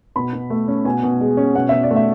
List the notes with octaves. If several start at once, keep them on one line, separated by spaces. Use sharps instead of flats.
B2 B5
B2
A3
C#4
B2 G#5
B2
G#3
C#4
B2 F#5
B2 E5
D5
A3
E5